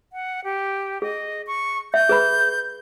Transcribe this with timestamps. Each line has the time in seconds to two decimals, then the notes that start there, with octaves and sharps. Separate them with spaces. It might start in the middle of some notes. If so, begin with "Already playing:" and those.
0.13 F#5
0.44 G4
1.02 G#4 D#5
1.47 C#6
1.94 E5 G6
2.09 G#4 B4 B5